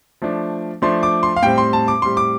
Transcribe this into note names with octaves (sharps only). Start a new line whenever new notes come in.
F3 A3 D4
F3 A3 D4 C6
D6
C6
F5
A2 G3 C4 G5
C6
A5
D6
A2 G3 C4 C6
D6